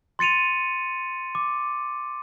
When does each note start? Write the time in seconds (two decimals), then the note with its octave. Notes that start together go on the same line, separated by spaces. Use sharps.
0.19 C6 A6 C#7 D#7 F7
1.35 D6